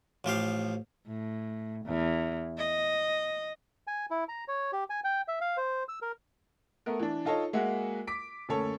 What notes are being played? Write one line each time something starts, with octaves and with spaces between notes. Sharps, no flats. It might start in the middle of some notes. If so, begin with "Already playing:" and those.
A1 F3 G4 F5
A2
E2
D#5
G#5
E4
A#5
C#5
G4
G#5
G5
E5
F5
C5
E6
A#4
A3 B3 A#4
E3 D4
D#4 F4 A4 C#5 D#5
G#3 A#3 F#4 G#4 E5 F#5
D6 B6 D7
F#1 D2 C#4 A4 C#5